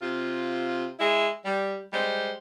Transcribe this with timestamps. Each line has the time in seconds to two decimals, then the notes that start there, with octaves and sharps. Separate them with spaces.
0.01 C3 F4
1.00 G#3 E4 E5
1.45 G3
1.93 G3 G#3 C5